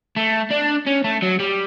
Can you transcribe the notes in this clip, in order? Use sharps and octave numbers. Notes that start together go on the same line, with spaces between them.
A3
D4
C#4
A3
F#3
G3